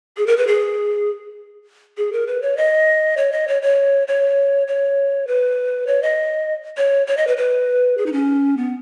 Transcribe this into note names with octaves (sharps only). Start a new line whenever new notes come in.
G#4
A#4
B4
G#4
G#4
A#4
B4
C#5
D#5
C#5
D#5
C#5
C#5
C#5
C#5
B4
C#5
D#5
C#5
C#5
D#5
B4
B4
G#4
D#4
C#4
B3